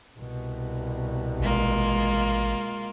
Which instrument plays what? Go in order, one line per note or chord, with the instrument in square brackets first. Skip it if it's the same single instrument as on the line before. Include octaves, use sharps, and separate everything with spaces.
[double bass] C2 B2
[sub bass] A1 [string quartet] G#3 A#3 F4